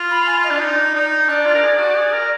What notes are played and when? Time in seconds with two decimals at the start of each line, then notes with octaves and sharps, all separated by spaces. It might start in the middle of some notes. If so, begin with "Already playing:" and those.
Already playing: F4
0.11 B5
0.26 G#5
0.44 D#5
0.49 D4 D5
0.61 D#4
0.95 D#4
1.29 D4 D5
1.46 F4
1.54 A#4
1.63 G#4
1.79 F#4
1.97 G#4
2.13 A#4